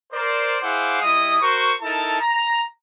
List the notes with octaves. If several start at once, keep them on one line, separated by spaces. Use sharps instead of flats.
A#4 C5 D5
E4 G#4 C5 F5 F#5 D6
G3 E4 D#5 D#6
F#4 A#4 C5 C#6
D#4 E4 A4 A#4 A5
A#5